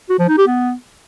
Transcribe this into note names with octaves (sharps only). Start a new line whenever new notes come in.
F#4
F3
D#4
G4
B3